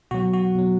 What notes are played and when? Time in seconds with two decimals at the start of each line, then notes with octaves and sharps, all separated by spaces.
0.11 B2 F#3 F#4
0.33 F#4
0.55 B2 F#3